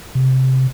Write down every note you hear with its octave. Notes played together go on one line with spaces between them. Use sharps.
C3